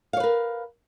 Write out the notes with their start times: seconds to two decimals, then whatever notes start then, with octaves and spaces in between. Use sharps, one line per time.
0.13 F5
0.17 C#5
0.20 B4
0.24 A#4